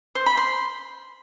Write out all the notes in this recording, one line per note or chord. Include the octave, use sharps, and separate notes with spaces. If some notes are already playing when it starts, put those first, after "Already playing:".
C5
B5
C6